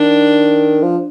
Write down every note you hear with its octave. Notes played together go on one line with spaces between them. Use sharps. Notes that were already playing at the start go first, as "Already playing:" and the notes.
Already playing: D#3 D4
F3